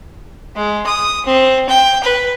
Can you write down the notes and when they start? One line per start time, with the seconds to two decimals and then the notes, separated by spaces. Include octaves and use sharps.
0.56 G#3
0.86 D#6
1.26 C4
1.69 G5
2.03 B4